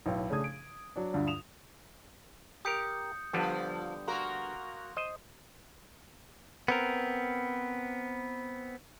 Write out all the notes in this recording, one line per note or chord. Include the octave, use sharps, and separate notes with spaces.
B1 A2 E4 B4 F5 G5
C#3 A3 D4 G#4 D#6 G#6
D7
F#3 D4
D2 G2 F4 D5
D#6 E7 F7
G4 A#4 D#6 G6 C#7
D3 F3 G3 B3
A#3 F#4 A#4 C6
C5 D#5
B3 C4 A#4